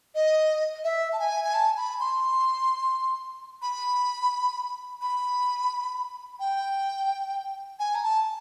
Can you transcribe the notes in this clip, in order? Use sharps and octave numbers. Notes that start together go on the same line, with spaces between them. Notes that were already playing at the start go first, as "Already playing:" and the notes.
D#5
E5
A5
G#5
G#5
A5
B5
C6
B5
B5
G5
G#5
A#5
A5